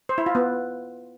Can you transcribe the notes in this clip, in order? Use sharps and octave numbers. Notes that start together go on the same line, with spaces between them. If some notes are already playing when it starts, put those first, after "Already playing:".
C5
E4
F4
B3